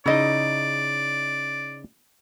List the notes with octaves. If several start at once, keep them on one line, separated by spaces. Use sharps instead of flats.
C#3 D#4 E4 D5 D#5